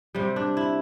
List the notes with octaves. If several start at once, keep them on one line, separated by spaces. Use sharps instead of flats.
C3 G3
D4
E4